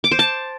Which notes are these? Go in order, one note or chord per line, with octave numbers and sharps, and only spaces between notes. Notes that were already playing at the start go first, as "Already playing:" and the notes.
D6
C5
A5